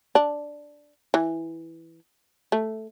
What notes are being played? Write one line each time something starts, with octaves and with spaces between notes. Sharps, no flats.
D4
E3
A3